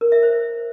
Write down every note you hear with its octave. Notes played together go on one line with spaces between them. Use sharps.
A#4
E5
C5